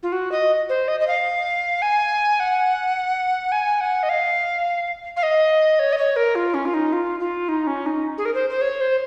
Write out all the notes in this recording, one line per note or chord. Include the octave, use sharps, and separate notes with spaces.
F4
F#4
D#5
C5
D#5
D#5
F5
G#5
F#5
G#5
F#5
D#5
F5
F5
D#5
C#5
D#5
C#5
A#4
F4
C#4
F4
D#4
F4
F4
D#4
C#4
D#4
G#4
A#4
C5
C5
C#5
C5